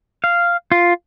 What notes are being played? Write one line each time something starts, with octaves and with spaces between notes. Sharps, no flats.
F5
F4